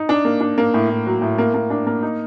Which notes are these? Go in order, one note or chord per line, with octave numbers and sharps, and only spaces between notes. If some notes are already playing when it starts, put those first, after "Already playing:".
Already playing: D#4
D4
A#3
D4
A#3
A2
A2
F#3
A2
A#3
A#3
D4
A#3
D#4